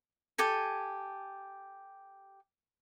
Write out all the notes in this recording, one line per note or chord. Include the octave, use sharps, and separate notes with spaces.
G4 A4 G#5